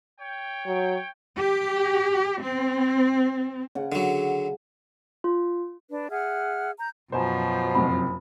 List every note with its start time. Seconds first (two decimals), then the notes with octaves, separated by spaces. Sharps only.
0.20 C#5 G5
0.67 F#3
1.36 G4
2.43 C4
3.75 C#3 F#5
3.92 D3 F#3
5.24 F4
5.89 D4 B4
6.10 G#4 E5 F#5 F6
6.78 A#5 G6
7.12 F#2 B2 F3 C5 G#5 A#5
7.75 F#1 F2 C3 B5